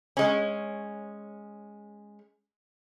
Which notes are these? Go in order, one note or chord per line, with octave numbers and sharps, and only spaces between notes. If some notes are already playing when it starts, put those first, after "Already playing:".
G#3 C#4